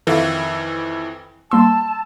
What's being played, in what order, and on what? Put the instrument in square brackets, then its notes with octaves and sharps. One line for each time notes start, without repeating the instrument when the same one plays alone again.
[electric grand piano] F2 D#3 E3 [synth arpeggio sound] A4 E5 F5
[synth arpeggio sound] G3 A#3 C6 [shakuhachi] A5 [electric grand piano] E6